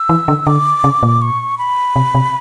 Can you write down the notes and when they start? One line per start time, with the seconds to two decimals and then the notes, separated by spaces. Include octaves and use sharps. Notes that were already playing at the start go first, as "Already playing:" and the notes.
Already playing: E6
0.09 E3
0.28 D3
0.47 D3 D6
0.84 C#3
1.03 A#2
1.22 C#6
1.58 B5
1.96 C3
2.15 C3